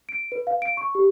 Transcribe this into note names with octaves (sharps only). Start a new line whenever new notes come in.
D7
B4
F5
D7
C#6
G4